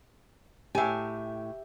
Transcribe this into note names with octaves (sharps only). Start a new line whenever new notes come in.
A2 G4 E5 G#5